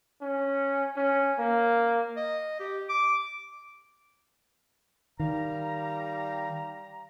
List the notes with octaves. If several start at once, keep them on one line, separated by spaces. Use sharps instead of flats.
C#4
C#4
A#3
D#5
G4
D6
D#3 G3 F5 A#5